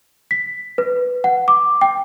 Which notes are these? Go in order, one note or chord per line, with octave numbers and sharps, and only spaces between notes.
B6
B4
F#5
D6
G5